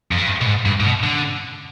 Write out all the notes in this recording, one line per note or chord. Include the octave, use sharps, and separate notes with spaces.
F2
G2
B2
G#2
G2
G#2
B2
D3